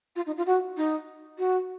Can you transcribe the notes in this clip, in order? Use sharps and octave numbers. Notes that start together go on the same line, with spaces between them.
F4
D#4
F4
F#4
D#4
F#4